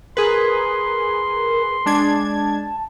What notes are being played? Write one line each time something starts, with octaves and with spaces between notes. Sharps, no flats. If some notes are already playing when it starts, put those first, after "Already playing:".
G#4 A#4 B4 C6
G#3 D4 A5 G#6